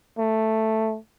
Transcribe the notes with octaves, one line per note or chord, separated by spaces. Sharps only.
A3